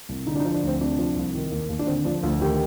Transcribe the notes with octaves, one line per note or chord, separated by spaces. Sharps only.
C2
D3 D#4
D4
D#4
F3
D4
D2 C4
C3 D4
F3
C2
D#3
D#2
D#2
D4
D3 C4
F3 D4
D2 F4
D#3 G4